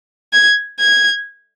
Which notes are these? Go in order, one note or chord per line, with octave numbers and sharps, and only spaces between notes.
G#6
G#6